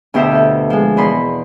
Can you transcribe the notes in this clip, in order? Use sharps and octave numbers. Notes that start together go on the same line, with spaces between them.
D2 B2 G4 C5 E5
F4 A4
F3 G#3
E2 B2 A#4 B5 C6